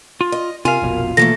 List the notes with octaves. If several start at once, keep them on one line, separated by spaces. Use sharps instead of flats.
F4
D#5
C3 F4 A#4 F5 G#5
F1 A#1 B2
B2 E3 F3 A3 A#3 A4 A#6